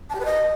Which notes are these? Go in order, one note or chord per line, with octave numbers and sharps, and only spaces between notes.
A5
G4
B4
D#5